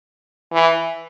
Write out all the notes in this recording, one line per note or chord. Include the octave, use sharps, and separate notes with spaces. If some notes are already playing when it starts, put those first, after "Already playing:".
E3